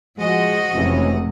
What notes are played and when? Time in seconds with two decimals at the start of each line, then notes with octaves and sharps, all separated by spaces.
0.18 F3 G#3 F#4 D#5
0.74 F1 C3 E3 G#3 C#4